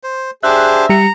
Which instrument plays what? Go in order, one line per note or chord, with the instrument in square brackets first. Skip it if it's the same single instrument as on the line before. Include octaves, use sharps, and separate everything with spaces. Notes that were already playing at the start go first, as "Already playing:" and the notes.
[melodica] C5
[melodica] D4 G4 C5 [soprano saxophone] G#4 [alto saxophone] E5 [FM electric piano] F#6
[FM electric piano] G3 G4 C#7 [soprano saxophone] A#5